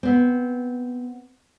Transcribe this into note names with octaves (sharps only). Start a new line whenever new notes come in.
B3 C4